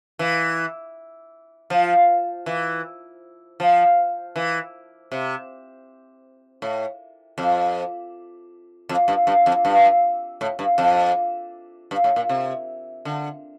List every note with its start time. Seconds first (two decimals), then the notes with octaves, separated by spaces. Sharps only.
0.19 E3
1.70 F3
2.46 E3
3.60 F3
4.36 E3
5.12 C3
6.62 A2
7.38 F2
8.89 F2
9.08 G2
9.27 G2
9.46 F2
9.65 G2
10.41 A2
10.59 G2
10.78 F2
11.91 G2
12.04 A2
12.16 A#2
12.29 C3
13.05 D3